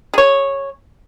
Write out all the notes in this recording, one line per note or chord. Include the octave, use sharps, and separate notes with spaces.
G#4 C#5